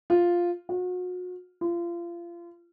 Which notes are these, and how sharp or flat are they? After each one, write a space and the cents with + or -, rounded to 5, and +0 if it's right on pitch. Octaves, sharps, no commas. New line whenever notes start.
F4 +0
F#4 -35
F4 -30